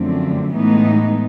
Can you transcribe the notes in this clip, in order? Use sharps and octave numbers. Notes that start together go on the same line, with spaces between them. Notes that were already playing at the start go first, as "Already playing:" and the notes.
Already playing: F#2 D3 F3 A3 C4
A2 E3 G#3 B3 D#4